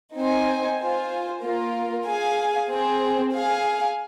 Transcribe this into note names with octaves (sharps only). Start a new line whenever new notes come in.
C4 D#4 C5 G#5
F4 C5 G#5
A#3 F4 A#4
G#4 F5 G#5
C4 G#4 C5
G#4 F5 G#5